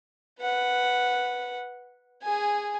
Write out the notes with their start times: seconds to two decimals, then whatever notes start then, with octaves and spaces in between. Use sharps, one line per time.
0.40 B4 F#5
2.23 G#4 G#5